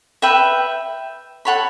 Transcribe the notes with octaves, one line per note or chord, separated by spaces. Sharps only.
B4 E5 G5
A4 C#5 F#5 B5